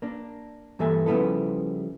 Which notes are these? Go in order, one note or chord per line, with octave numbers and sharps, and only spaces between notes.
A#3 D4
G2 E3 A#3 A4 E5 G#5
C#3 F3 G3 B3 E4 A4